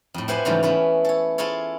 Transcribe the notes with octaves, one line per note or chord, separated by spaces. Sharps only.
F2 A2
E4 G4 B4 C5 F#5 G#5
G#2 C#3 E3 F3 G3 A3
A3 B3 C#4 E4
A4 C#5
E4 F4 G#4 A4 C#5